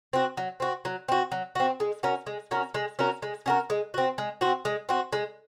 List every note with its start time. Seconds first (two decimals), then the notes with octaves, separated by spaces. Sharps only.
0.13 C4 F#4
0.37 F#3
0.60 C4 F#4
0.85 F#3
1.08 C4 F#4
1.32 F#3
1.55 C4 F#4
1.80 G#3
2.03 C#4 F#4 A#4
2.27 G#3
2.51 C#4 F#4 A#4
2.74 G#3
2.99 C#4 F#4 A#4
3.22 G#3
3.46 C#4 F#4 A#4
3.70 G#3
3.94 C4 F#4
4.18 G#3
4.41 C4 F#4
4.65 G#3
4.89 C4 F#4
5.13 G#3